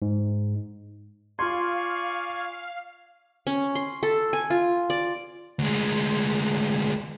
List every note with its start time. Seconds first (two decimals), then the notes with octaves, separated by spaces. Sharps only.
0.02 G#2
1.39 F4 D5 F5 G#5 C6 C#6 G#6
3.47 C#4
3.75 C6
4.03 A4
4.33 G#5
4.50 F4
4.90 D5
5.59 D2 G#3